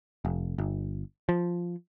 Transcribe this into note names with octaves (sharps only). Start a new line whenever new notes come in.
F1
G1
F3